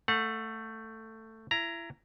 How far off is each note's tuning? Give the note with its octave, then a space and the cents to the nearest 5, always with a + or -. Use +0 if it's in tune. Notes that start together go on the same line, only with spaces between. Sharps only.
A3 +15 F#5 -25
E4 +30 A#5 +0